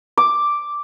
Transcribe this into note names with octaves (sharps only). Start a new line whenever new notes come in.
D6